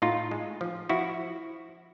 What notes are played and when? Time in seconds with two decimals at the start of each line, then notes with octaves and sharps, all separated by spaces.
0.02 A2 D#4 F4
0.31 G#3
0.61 F3
0.89 F3 E4 F#4